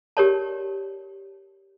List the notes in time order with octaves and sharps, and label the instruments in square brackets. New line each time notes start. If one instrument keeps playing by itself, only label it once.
[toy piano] G4 A#4 C#5 D5 A5